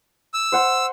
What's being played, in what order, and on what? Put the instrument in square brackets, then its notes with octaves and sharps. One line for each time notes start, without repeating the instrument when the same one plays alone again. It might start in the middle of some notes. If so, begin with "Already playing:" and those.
[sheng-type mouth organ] E6
[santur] C5 F#5 C6